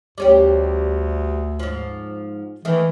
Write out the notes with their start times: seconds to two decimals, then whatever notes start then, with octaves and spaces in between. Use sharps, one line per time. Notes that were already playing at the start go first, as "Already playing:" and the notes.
0.18 D2 G3 C#4 G4
1.59 G#2 F3
2.65 D#3 E3 A3